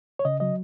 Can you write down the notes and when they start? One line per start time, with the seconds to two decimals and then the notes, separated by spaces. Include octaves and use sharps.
0.19 C#5
0.25 C#3 D#5
0.40 F#3 D#5